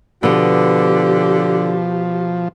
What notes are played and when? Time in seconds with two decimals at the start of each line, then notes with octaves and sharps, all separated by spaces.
0.23 B2 D3 F3 B3 G4